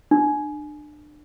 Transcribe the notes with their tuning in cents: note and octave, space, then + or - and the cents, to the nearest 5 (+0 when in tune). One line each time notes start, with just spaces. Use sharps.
D4 +30